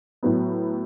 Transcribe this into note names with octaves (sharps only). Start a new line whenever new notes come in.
A2 F#3 B3